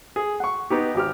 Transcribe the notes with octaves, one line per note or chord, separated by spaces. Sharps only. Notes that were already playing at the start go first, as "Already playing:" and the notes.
G#4
F#5 C#6
B3 D#4 G4
G#1 G4 F6